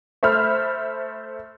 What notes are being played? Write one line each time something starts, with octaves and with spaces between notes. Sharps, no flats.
A3 C5 E5 B5 F6